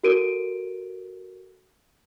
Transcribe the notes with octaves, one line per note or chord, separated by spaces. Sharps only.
F#4 A4 A#4 D7 D#7